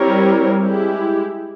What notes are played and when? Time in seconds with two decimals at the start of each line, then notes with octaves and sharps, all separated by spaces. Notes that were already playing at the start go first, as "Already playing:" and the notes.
Already playing: G3 C4 E4 A#4 C#5
0.61 G#3 E4 G4